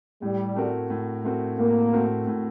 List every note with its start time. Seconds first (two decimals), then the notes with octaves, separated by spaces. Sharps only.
0.22 A2 G3
0.56 A3 C4 F#4 A#4
0.90 A2
1.24 A3 C4 F#4 A#4
1.58 A2 A#3
1.93 A3 C4 F#4 A#4
2.27 A2